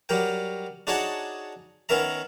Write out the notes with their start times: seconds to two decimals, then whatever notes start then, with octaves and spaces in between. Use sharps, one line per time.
0.09 F#3 G3 A#4 G5
0.87 D4 D#4 F#4 G#4 C#5 A5
1.89 D#3 B3 C#4 A#4 E5 A#5